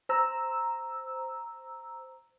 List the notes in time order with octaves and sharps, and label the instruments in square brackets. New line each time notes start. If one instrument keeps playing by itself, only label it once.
[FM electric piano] C5 A#5 E6